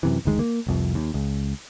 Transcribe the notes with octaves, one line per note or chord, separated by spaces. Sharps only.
F#2 C3 E3
F#1 D2 D#3 G#3
A#3
F1 C2 F2
D#2
C#2